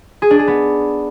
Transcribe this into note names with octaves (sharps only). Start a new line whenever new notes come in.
G#4
D4
G#4
B3